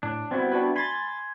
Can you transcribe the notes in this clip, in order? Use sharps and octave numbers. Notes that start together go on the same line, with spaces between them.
A2 D4
G3 B3 C4 E4 F#4
D4 F#4 B4
G#5 B5 C6 A6